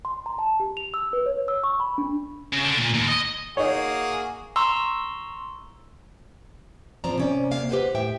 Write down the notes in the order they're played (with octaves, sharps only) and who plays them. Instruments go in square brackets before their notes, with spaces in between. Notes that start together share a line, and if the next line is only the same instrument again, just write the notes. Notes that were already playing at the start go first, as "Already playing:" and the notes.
[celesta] C6
A#5
A5
G4
F7
E6
B4
C#5
E6
C#6
B5
D4
[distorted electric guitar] C#3
D3
A#2
D#2
D#5
[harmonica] A#3 F#4 G#4 [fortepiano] D#4 C#5
[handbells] A#5 C6 C#6 E6
[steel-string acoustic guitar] G#2 F3 C4 C#4 D5 A#5
C3 C#4 D5
C3 A#3 E5 F5
G4 B4 C5 F#5
A2 E5 G5